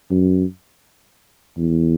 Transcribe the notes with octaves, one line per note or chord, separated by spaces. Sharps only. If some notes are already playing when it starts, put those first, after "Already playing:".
F#2
E2